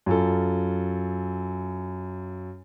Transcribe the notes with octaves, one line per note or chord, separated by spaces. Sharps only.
F#2 F4 A4